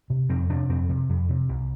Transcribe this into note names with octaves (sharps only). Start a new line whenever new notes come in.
C3
F2 C4
C3 D4
F2 C4
C3
F2
C3
C2